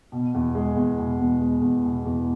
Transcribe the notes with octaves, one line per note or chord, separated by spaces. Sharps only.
B2
E2
G#3
E2
B2
E2
G#3
E2
B2
E2